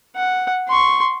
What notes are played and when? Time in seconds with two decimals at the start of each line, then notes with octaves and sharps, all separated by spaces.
0.15 F#5
0.68 C6 C#6